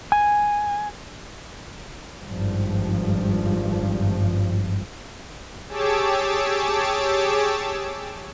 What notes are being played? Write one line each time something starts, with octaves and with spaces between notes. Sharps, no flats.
G#5
G#1 G2 F3
G4 G#4 C#5 A5 D6 E6